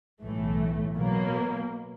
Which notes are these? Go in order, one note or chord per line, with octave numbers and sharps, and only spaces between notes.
B1 A2 E3 A3
B2 F#3 A#3